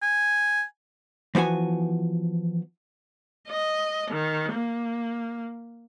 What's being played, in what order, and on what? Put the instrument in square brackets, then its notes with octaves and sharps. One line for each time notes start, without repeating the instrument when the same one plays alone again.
[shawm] G#5
[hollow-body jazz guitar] E3 F3 B3 F#4 G#5
[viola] D#5
D#3
A#3